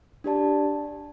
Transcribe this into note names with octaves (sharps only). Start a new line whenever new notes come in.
D4 G4 D5 A5